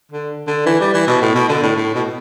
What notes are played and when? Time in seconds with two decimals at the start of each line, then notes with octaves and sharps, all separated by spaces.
0.12 D3
0.47 D3
0.66 E3
0.80 G3
0.94 E3
1.07 B2
1.21 A2
1.35 B2
1.49 D3
1.63 A2
1.77 A2
1.95 B2